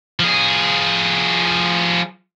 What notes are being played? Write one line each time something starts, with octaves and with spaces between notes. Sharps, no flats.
F3 G#4